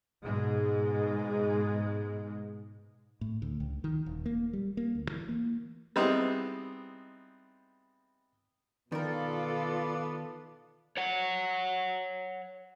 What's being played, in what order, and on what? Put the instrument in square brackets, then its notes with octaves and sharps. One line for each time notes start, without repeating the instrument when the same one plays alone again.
[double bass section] G#2 B2 G#3
[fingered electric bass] A2
D2
C#2
D#3
D#1
A#3
G3
A#3
D2
E3
A#3
[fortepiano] G3 G#3 B3 C4 D#4 E4
[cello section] B2 F4 A4 [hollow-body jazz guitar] D#3 A#4 [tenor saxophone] B3 [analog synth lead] D5
[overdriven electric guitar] C#5 F#5